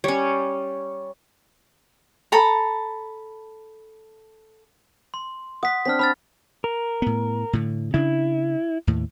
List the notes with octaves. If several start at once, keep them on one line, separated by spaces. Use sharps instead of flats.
G3 C#4 C#5
A4 A#5 B5
C6
F#5 D#6 B6
C4 D4 F6 B6
D4 B5 F6 A6
A#4
A2 B3
A2 D3
C#3 D4 E4
D#2 A2